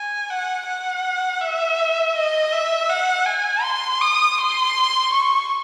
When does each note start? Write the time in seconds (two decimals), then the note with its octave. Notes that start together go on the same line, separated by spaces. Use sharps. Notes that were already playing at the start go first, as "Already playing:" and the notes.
Already playing: G#5
0.30 F#5
0.67 F#5
1.41 E5
2.16 D#5
2.52 E5
2.90 F#5
3.26 G#5
3.64 C6
4.01 D#6
4.38 C6
5.13 C#6